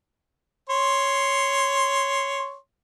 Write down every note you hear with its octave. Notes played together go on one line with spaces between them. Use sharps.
C#5 C6